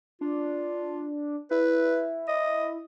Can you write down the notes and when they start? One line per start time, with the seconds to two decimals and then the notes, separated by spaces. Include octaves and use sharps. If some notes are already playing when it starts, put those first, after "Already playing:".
0.21 D4 F4
1.51 E4 B4
2.28 D#5